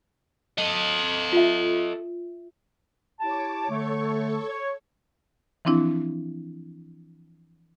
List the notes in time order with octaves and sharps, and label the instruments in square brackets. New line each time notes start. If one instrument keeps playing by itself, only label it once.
[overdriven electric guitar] A4 D#5
[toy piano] F4 E5
[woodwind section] E4 G4 A5 [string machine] C#5 D6
[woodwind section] D3 A3 [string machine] A4 C#5 C#6
[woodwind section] C#5
[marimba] E3 F3 C4 D4 E4